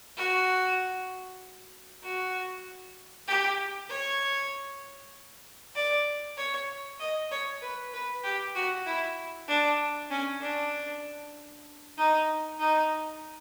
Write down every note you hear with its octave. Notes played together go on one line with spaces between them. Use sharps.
F#4
F#4
G4
C#5
D5
C#5
D#5
C#5
B4
B4
G4
F#4
E4
D4
C#4
D4
D#4
D#4